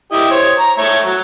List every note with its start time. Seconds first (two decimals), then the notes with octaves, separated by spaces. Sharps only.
0.13 E4 G4 D#5
0.31 C5 C#5
0.59 A#5
0.78 A3 C#5 E5
1.05 F#3